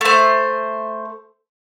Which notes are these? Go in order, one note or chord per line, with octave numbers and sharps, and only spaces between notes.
A3 C5